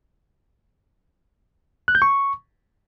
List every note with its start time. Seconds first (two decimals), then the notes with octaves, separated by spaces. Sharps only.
1.88 F#6
1.95 G6
2.02 C#6